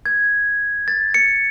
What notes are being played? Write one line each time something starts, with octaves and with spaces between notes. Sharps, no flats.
G#6
A6
C#7